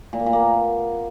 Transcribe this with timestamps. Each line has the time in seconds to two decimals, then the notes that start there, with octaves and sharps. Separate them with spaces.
0.13 A#2
0.20 A#3
0.26 A#2
0.33 A#3
0.40 B3